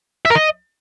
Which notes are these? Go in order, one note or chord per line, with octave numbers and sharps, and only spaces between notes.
E5
A#4
D#5